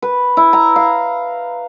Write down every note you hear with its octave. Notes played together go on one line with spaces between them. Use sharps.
B4
E4
A#5
F5